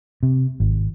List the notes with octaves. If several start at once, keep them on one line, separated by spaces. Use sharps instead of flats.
C3
G#1